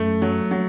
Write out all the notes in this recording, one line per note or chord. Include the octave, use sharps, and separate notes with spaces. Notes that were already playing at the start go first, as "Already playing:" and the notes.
Already playing: F#2 A3
F#3
F#3